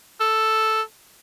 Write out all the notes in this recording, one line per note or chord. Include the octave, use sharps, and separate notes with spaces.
A4